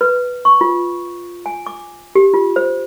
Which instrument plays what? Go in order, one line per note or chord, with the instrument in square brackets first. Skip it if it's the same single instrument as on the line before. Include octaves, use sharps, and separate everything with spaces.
[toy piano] B4
C#6
F4
G#5
D6
G4
F4
C5